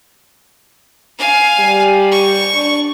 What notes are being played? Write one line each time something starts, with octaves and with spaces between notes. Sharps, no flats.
F5 G#5
G3
C#6
D4